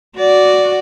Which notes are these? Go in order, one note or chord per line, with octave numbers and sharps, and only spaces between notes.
F#4 D5